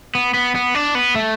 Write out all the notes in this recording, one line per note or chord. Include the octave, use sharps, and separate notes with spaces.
B3
B3
B3
D4
B3
A3